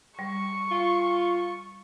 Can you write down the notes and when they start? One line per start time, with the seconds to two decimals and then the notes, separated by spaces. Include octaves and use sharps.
0.19 G3 C#6
0.71 F4